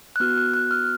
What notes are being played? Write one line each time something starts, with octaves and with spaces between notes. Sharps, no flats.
F#6
B3 F#4 F6
F#6
F#6
F6